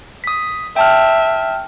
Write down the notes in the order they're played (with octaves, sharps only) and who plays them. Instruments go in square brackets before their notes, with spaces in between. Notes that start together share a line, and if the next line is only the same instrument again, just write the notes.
[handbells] D#6 B6
[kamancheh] E5 [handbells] G5 A5 F6